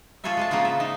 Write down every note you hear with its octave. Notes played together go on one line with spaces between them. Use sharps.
F4 G#4 A4 C5 C#5 E5
G#3 G#4 A5
C#3 A#3 B3 F4 C5
E5
D#4